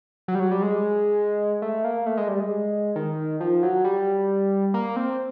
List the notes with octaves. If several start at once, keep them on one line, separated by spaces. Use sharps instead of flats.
F#3
G3
F#3
G3
G#3
A3
A#3
A3
G#3
G3
G#3
D#3
F3
F#3
G3
A#3
C4